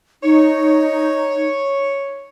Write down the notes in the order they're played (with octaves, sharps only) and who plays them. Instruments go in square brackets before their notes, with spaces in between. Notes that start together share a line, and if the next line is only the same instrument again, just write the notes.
[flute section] D#4 [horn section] C#5